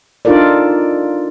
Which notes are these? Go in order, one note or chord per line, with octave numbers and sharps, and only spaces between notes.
D4 D#4 F4 A4 A#4 D5